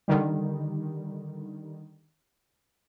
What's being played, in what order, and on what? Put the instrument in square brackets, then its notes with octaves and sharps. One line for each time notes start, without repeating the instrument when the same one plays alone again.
[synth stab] D3 D#3 G3